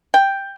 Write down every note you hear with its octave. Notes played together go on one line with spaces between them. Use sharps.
G5